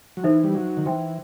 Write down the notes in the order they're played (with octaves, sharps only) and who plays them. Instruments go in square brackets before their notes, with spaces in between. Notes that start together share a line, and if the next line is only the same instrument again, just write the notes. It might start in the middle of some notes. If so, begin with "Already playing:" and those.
[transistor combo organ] F#3
[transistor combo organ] E3 [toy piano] D#4 A4 C5 E5
[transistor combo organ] G3
F#3
D#3
[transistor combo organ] E3 [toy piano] C5 E5 G5 C6